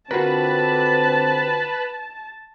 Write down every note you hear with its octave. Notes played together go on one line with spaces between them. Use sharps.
D3 C4 F4 F#4 A#4 B4 A5